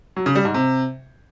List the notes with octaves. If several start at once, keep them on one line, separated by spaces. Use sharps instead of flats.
F#3
C#3
G3
G#2
C3